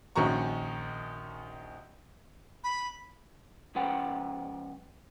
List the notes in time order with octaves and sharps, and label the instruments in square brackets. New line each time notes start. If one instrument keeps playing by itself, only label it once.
[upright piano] A#1 D#3 C#4 F#4 A#5 C#6
[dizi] B5
[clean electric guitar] C#2 F3 C#4 B4 F#5 G5